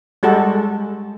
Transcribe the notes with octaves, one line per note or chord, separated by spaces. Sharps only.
G3 G#3 F#4 A4